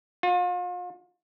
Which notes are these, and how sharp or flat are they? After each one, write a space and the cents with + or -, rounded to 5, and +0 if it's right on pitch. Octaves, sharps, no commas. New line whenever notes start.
F4 +40